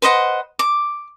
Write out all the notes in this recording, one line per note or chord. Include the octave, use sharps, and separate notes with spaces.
B4 C5 D#5 F#5
D6